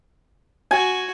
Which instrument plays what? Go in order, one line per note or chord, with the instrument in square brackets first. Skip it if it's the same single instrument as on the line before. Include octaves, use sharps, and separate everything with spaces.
[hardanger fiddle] F#4 [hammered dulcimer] G#5